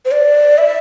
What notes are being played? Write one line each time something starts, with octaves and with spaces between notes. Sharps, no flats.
C5
D5
E5